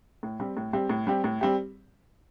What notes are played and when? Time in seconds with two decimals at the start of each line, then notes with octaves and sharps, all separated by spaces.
0.23 A2
0.40 G3 C4 G4
0.57 A2
0.73 G3 C4 G4
0.90 A2
1.07 G3 C4 G4
1.24 A2
1.41 G3 C4 G4